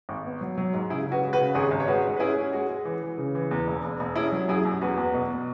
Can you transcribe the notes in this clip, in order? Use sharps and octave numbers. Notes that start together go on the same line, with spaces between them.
G#1
B3
F#3
F#3
G#2
C#3 E4 G#4
C#3
F#4 B4
G#3
F#4 B4
C#3
G#1 G#4 C#5
G#1
C#5
G#3 F#4 B4
G#2
B4
C#4 E4 G#4
C#4
G#3 F#4
G#3
E3
E3
C#3
E3
E2
E1
E1
E1
C#4 E4 G#4
F#3
F#2 E4 G#4
F#2
E2 F#4 B4
E2
B2